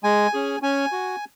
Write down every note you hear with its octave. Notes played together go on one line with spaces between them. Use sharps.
G#3 G#5
C#4 G#4
C#4 G#5
F#4